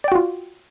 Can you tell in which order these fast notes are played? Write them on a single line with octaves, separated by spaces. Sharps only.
D5 G5 F#4 F4